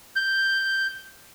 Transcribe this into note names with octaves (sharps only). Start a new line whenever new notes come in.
G6